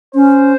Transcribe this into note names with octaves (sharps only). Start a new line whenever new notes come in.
C#4 C5